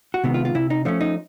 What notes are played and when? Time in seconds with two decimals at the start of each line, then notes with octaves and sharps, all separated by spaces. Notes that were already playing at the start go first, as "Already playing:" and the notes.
0.14 F#4
0.24 C3 D#3 G#3 B3
0.34 F4
0.45 F4
0.55 C3 E4
0.70 D#4
0.85 F3 A3 C#4 D4
1.01 D#4